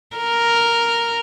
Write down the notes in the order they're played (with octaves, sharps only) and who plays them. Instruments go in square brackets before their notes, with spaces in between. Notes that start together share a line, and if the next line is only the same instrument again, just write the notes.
[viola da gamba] A#4